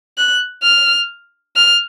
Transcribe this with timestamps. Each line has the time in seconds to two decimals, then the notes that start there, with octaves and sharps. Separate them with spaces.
0.18 F#6
0.63 F6
1.56 F6